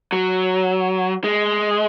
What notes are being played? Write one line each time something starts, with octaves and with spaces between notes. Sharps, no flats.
F#3
G#3